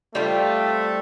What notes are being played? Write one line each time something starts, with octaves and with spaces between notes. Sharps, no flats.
G3 A3 C4 F4